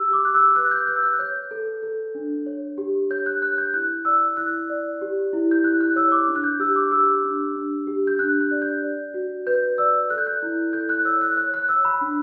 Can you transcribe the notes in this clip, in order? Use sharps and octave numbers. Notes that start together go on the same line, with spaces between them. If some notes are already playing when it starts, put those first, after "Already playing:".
Already playing: G4 E6
D6
G4 F#6
E6
B4 F#6
G6
B4 G6
E6
F#6
C#5 G6
A4
A4
D4
C#5
G4
C#5 G6
F#6
C#5 F#6
G6
E4 F#6
D5 E6
E4 F#6
D5
G4
E4
G6
E4 F#6
F#6
C#5 E6
D6
D4
F#6
G6
G4 E6
D6
G4 E6
D4
D4
G4
G6
D4 F#6
F#6
D5
G6
D5
F#4
B4 G6
D5 E6
A4 F#6
G6
F#6
E4
A4 G6
F#6
C#5 E6
F#6
C#5 F#6
F#6
C#5 E6
B5
D4